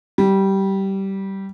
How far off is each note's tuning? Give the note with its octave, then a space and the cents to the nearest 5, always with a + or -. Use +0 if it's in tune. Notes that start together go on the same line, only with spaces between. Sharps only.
G3 -15